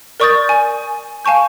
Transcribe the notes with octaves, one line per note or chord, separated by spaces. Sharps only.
A#4 D5 C#6 D#6 G6 A6
G#5
F5 G#5 A5 C#6 G6